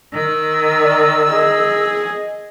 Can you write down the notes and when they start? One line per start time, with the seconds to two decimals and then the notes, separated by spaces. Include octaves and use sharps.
0.13 D#3 E6
0.84 D5
1.31 G#4 D#5